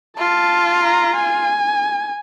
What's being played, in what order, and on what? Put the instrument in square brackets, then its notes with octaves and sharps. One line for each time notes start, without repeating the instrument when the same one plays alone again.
[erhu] F4 [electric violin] A5
[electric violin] A#5
G#5